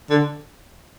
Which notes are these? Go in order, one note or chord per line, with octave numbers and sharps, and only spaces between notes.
D3